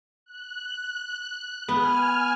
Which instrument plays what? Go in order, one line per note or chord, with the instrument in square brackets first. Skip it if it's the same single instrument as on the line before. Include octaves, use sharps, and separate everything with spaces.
[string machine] F#6
[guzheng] B3 [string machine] G#5 F6